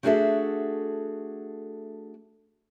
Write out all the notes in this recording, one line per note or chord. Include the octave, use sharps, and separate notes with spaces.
A3 D4 F#4 G#4 A4 E5